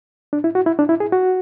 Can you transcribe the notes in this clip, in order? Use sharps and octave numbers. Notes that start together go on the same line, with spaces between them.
D4
E4
F#4
E4
D4
E4
G#4
F#4